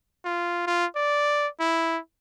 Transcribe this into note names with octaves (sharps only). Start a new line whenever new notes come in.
F4
F4
D5
E4